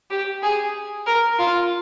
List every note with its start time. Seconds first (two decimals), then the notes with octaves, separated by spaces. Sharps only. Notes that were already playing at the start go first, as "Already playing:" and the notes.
0.11 G4
0.43 G#4
1.06 A#4
1.39 F4